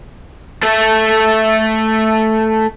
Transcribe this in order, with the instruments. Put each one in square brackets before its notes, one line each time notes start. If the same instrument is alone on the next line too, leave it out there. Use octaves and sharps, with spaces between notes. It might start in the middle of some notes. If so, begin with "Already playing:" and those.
[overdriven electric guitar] A3 A4